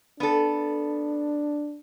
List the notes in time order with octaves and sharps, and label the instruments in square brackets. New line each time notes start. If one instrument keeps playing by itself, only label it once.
[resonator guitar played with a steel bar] B3 A4 [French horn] D4